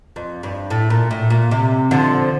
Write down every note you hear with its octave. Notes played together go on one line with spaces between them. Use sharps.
F2
G2
A2
A#2
A2
A#2
C3
D3 F3